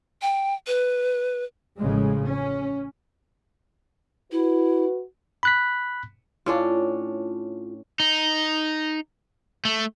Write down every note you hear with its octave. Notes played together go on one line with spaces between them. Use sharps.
G5
B4
A1 C#3 F3 G#3
C#4
E4 F#4 B4
B5 F#6 B6
A2 C#4 D4 F4
D#4
A3